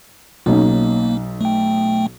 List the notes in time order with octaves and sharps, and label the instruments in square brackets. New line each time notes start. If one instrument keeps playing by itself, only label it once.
[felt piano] B1 C#4 D#4 [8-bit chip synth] A#3
[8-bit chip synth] A3 G5